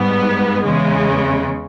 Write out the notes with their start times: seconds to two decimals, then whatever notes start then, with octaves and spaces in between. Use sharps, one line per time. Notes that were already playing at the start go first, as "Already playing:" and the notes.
Already playing: G#2 G3 B3
0.63 E2 C#3 G#3